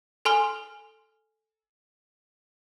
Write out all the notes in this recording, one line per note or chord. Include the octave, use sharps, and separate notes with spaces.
A4 G#5 C6 F6 G7